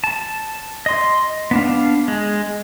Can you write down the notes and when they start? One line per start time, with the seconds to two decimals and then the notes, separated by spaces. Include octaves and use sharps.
0.04 A5
0.86 D#5 C6
1.51 B3 D4 F5
2.08 G#3